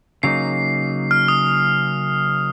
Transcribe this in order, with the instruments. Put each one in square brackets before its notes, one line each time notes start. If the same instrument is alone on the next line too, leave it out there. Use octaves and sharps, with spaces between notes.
[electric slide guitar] C#3 F#3 A#3 D#4 [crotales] C7
[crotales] F6
D#6